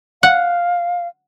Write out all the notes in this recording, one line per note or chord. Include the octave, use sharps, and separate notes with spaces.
F5 F#5